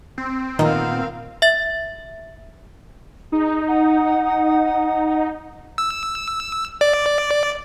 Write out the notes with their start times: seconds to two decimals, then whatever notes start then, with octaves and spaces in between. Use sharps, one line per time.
0.18 C4
0.59 A#2 D#3 B3 A#4 F5
1.42 E5 A6
3.32 D#4 G#4
3.68 F#5
5.78 E6
6.81 D5